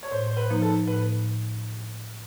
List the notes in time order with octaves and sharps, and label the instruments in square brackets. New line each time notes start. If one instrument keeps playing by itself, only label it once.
[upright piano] C#5
[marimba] A2 [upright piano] C5
[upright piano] C5
B4
[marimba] F3 A#3 D#4
[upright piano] A4
[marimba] A2 [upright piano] B4